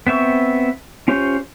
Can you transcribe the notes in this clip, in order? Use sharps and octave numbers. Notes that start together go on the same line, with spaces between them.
B3 C4 E5 C#6
C#4 F4 G4 C5 C#5